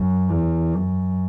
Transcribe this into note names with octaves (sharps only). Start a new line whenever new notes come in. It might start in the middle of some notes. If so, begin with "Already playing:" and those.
Already playing: F#2
E2
F#2